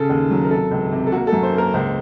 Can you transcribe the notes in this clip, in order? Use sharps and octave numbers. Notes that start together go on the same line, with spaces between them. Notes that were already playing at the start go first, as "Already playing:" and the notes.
Already playing: C#3 A4
D#2
F#3
A#4
C3 A4
C#2
C3
A4
A#3 F#4
A4
F#2
C5
A#3
A#4
C#2 C5